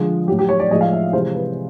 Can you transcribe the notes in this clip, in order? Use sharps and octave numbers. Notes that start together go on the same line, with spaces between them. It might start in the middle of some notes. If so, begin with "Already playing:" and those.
Already playing: D3 F3 G#3
A2 F#3 G4
G4
C#5
D5
A2 F3 G#3 D#5
F5
E5
C3 E3 G#3 C5
B4